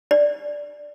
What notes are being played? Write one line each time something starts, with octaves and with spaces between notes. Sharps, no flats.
D5